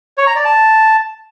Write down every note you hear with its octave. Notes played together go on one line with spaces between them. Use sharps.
C#5
A#5
D5
A5